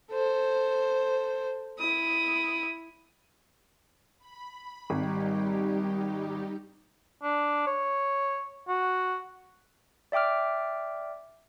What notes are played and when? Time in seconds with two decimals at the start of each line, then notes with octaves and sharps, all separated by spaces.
0.11 A4 C5
1.78 E4 D#6
4.19 B5
4.90 G#1 G3 D#4 G4
7.23 D4
7.67 C#5
8.68 F#4
10.12 D5 E5 G5 D6 F6